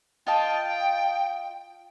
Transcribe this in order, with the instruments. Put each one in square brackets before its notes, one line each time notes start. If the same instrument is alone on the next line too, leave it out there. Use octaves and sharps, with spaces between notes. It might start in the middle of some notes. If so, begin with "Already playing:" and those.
[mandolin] F4 D#5 A5 [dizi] G5